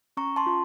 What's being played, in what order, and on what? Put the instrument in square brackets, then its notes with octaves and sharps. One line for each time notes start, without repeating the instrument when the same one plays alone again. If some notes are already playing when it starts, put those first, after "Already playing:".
[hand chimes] C#4 A#5 C#6
A5 C6
F4